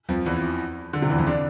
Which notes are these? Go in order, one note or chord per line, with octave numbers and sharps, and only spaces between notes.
F2 F3
E2 E3
D3
C3
E2 E3
F2 F3
D3 D4